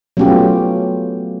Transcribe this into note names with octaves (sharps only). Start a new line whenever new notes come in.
F#3 A3 B3 C#4 F4 G4